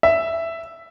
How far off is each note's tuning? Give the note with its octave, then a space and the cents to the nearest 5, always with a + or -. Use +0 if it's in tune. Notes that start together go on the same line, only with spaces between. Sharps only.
E5 +5